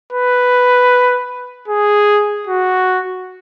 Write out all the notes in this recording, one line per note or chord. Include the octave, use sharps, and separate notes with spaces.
B4
G#4
F#4